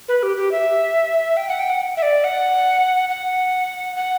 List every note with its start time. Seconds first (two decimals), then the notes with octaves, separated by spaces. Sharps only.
0.08 B4
0.23 G4
0.37 G4
0.52 E5
1.37 G5
1.48 F#5
1.59 G5
1.69 F#5
1.97 E5
2.02 D5
2.24 F#5
3.09 F#5
3.96 F#5